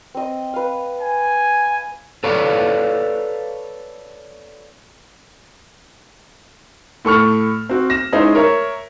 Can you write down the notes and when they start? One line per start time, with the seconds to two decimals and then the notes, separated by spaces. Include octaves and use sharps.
0.14 C4 D#5
0.54 B4 F5
1.00 G#5
2.24 A4 B4 C#5 D5 F5
7.05 A2 A4 C#6 F6
7.69 C4 F#4
7.90 A#6 E7
8.12 G#3 C#4 D#4 E4 C5
8.35 A#4 C#5 E5